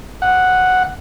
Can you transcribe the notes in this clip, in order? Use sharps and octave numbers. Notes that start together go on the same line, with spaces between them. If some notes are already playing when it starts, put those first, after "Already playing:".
F#5